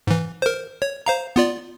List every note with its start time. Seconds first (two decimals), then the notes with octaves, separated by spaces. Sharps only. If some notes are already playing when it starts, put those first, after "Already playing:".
0.07 G#2 E3
0.42 A#4 C5
0.82 C#5
1.06 C5 F5 A#5
1.36 B3 F4 D5